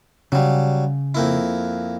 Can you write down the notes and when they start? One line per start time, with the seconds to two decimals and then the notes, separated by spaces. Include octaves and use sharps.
0.32 C#3 F#3 G3
1.15 F2 A#3 E4